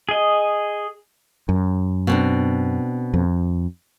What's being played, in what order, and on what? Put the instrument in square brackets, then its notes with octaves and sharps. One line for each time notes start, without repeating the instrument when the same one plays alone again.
[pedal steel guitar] G#4 D#5
[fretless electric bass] F#2
[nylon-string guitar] B2 C4 D4
[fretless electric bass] F2